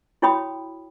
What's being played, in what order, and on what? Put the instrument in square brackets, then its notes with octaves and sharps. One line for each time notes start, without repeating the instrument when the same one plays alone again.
[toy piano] E4 F#4 C#5 G5 B5 D#6